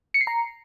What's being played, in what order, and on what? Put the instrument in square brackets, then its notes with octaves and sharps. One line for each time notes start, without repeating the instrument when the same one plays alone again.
[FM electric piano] C#7
C7
A#5